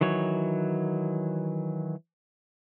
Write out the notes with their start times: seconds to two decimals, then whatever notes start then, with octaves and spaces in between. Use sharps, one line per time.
0.01 D#3 E3 F#3 C#5